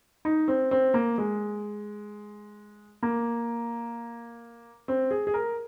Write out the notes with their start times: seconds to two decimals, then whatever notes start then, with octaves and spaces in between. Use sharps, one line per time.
0.25 D#4
0.48 C4
0.71 C4
0.94 A#3
1.18 G#3
3.03 A#3
4.88 C4
5.11 G#4
5.27 G#4
5.34 A#4